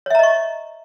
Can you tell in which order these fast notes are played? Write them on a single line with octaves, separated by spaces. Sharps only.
C#5 E5 A#5 D#5 C#6